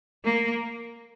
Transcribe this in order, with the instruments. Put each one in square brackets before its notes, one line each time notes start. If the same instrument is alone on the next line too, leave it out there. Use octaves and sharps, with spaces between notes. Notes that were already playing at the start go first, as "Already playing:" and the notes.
[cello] A#3